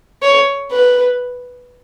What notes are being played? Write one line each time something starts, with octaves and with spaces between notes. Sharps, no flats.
C#5
B4